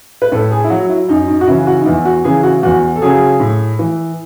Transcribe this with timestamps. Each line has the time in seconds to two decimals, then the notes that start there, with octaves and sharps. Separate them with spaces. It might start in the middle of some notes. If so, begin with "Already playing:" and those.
0.22 B4
0.32 A2 A4
0.51 G#4
0.64 E4
0.70 F#3 F#4
0.89 E4
1.09 F#2 D#4
1.28 D#4
1.41 F#4
1.47 C#3 E4
1.50 E3
1.67 F#4
1.82 D#4
1.86 E2 E4
2.05 F#4
2.24 C#3 E3 G#4
2.43 F#4
2.63 E2 F#4
2.96 A4
3.02 C#3 F#3 G#4
3.40 A2
3.79 E3